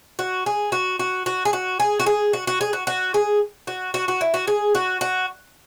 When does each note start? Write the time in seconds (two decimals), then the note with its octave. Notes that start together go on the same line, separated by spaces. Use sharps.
0.19 F#4
0.46 G#4
0.72 F#4
0.99 F#4
1.26 F#4
1.45 G#4
1.53 F#4
1.80 G#4
2.00 F#4
2.06 G#4
2.33 F#4
2.47 F#4
2.61 G#4
2.73 F#4
2.87 F#4
3.14 G#4
3.67 F#4
3.94 F#4
4.08 F#4
4.21 E4
4.34 F#4
4.47 G#4
4.75 F#4
5.01 F#4